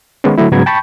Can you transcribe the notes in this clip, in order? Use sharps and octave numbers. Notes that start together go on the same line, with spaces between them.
D#3 G#3 B3 C#4
D3 F#3 A3 E4
G#2 C#3 F#3 B3 A#5 G#6
G5 A5 B5 C#6 G6